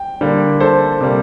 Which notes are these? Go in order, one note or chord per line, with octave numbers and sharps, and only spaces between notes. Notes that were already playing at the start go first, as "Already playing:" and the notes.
Already playing: G5
D3 G3 A#3
A4 C5
C3 G3 A#3